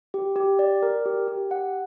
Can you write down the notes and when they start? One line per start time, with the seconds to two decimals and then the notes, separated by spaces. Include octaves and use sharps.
0.14 G4
0.36 G4
0.59 D5
0.82 A#4
1.06 G4
1.28 G4
1.51 F#5